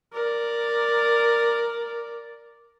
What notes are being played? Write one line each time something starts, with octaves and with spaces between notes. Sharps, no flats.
A#4 D5